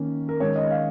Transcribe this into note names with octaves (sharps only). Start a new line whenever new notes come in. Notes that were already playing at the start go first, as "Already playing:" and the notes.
Already playing: D#3 A#3 C#4
A#4
D#3 G#3 C#4 C#5
D#5
F5